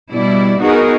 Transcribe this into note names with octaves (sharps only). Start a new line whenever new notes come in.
B2 G3 E4 D5
B3 D#4 F#4 G#4 A#4